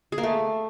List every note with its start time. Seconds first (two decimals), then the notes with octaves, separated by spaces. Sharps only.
0.12 G#4
0.18 A#3
0.23 A3